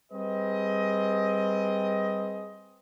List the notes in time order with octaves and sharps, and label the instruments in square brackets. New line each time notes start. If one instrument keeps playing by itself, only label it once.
[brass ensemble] G3 C4 G#4 B4 D#5